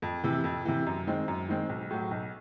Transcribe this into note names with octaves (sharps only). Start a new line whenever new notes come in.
F2
C3 E3
F2
C3 E3
F#2
D#3 G#3 C4
F#2
D#3 G#3 C4
B1
A2 F#3
B1